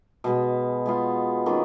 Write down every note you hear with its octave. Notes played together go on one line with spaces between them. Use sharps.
B2 G#3 B3
G#3 B3 F4
D#3 A#3 C#4 F4